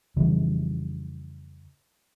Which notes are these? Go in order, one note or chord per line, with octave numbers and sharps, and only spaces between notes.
F2 C#3 E3 G3